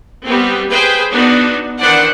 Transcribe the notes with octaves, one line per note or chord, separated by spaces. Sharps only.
G3 B3 C4
G#4 B4 C5 G5
B3 D4 D#4 F#4
D#3 E3 D4 C5 D5 F#5